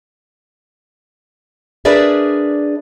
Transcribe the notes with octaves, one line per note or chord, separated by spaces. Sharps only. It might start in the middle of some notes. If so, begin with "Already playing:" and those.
D4 G#4 A#4 B4 D5 E5